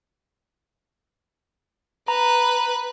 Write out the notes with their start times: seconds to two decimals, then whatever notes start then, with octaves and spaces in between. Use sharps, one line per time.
2.08 B4 A#5